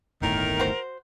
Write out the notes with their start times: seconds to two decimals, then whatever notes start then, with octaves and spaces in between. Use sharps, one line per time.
0.22 D1 G1 A2 D#3 A#4
0.60 F#4 C5